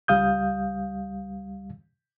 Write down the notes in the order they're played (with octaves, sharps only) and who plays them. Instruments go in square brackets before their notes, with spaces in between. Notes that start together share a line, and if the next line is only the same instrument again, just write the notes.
[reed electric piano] C#2 G3 F5 D#6 G6